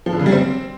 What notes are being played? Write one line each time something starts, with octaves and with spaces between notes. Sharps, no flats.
F3
D3
C#3
G3
C4